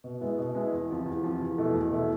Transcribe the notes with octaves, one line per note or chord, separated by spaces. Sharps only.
B2
G#3 B3 E4
B2
G#3 B3 E4
E2
C3 F3
E2
C3 F3
E2
B2 A3 E4
E2
B2 A3 E4